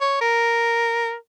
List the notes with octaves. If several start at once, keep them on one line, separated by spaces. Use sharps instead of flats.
C#5
A#4